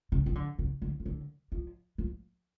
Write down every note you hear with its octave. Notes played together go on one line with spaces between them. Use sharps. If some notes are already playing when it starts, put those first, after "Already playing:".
C#3
F3
D3
C#3
D3
F3
D3
F3
F3